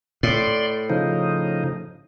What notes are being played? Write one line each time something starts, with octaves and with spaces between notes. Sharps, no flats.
A2 D5 C6
C#3 F3 D#4